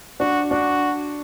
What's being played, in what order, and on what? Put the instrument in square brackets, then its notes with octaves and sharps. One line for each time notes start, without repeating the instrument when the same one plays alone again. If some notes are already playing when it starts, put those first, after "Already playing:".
[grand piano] D4 [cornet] F#4
[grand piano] D4 [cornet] F#4